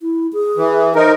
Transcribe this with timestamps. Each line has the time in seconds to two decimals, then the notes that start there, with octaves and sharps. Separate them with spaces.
0.01 E4
0.33 G#4
0.57 E3
0.95 D#4 A#4 C5